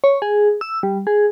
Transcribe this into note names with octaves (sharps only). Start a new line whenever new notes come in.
C#5
G#4
E6
G3
G#4